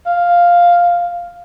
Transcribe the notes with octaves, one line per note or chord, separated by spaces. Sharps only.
F5